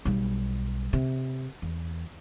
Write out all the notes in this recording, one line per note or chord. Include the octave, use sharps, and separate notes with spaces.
B1 G3
C3
E2